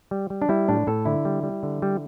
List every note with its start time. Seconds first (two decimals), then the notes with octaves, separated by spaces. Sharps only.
0.11 G3
0.30 G3
0.42 D4
0.49 G3 E4
0.68 A2 D4
0.87 A2 A4
1.05 D3 E4
1.25 G3
1.43 G3
1.63 D3
1.82 G3